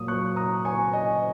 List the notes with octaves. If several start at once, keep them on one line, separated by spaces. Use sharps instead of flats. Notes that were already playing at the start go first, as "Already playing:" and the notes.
Already playing: A#2 F#3 A#3 D#6
C#6 F#6
A#5 D#6
G#5 C#6
D#5 G#5